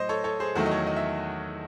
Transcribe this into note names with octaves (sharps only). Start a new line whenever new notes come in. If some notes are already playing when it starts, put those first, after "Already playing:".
Already playing: A2 F#3 C5 D#5
A4 C#5
A4 C#5
G#4 C5
E2 D#3 F#3 A3 F#4 A4
D#5
A4 C#5
D#5
E5